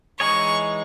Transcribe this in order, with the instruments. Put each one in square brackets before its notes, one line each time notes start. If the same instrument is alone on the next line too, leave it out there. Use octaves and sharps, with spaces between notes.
[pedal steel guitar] E3 G#3 D#4 G#4 C#5 [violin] C#6